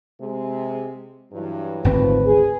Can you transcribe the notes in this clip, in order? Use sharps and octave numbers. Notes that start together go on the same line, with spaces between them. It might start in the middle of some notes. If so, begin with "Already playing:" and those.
C3 G#3
G2 E3 F#3
G#1 D2 D#3 F3 C4 B4
G#4